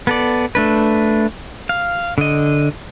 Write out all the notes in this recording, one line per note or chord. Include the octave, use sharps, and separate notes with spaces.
B3 A4 D5
A3 D4 B4
F5
D3 D#5